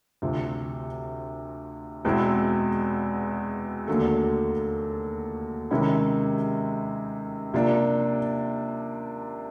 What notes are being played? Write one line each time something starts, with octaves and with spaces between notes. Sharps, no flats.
D2 C3 F3
E2 B2 G#3 C4 E4
D#2 D3 F#3 A3
C3 D#3 G#3 C#4 E4
C3 F3 A#3 D4